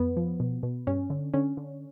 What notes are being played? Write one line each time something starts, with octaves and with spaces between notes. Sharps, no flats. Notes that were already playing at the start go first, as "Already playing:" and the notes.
Already playing: F2 B3
F3
B2
B2
G2 C#4
D3
D3 C#4
D3